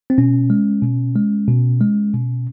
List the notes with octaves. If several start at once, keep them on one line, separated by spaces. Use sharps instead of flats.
C4
B2 C#4
G#3
B2
G#3
B2
G#3
B2